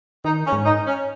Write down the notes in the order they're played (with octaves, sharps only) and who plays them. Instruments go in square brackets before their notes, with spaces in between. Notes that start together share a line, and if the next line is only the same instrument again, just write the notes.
[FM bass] D#3 [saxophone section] D#4
[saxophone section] C#4
[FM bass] G#2
[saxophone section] D#4
C#4